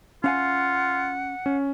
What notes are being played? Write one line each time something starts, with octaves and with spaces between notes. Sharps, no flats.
C#4 F4 F5 F#5 G#5
C#4